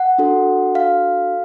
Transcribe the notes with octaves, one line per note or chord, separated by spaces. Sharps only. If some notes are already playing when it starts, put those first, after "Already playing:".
Already playing: F#5
D4 F#4 A4
F5